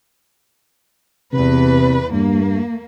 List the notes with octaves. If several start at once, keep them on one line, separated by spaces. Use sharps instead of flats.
E2 C3 B4
G2 A#3